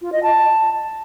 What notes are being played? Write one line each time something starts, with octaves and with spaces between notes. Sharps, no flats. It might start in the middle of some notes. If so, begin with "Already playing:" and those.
F4
D#5
A5